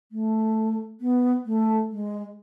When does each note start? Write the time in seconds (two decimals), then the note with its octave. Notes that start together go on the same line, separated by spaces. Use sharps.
0.12 A3
1.01 B3
1.46 A3
1.91 G#3